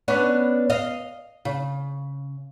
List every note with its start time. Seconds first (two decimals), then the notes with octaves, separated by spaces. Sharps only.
0.08 B3 C#4 D4
0.70 D#5 F5
1.45 C#3